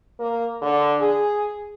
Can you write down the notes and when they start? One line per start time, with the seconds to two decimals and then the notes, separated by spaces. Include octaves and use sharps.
0.20 A#3
0.61 D3
1.00 G#4